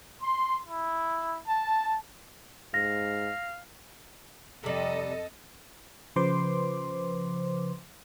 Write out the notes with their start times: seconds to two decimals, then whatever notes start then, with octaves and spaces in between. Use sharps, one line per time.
0.22 C6
0.68 E4
1.47 A5
2.74 G#2 F5 A#6
4.64 F2 C3 G3 A4 D#5
6.16 C#3 F3 B4 C5 C6 D6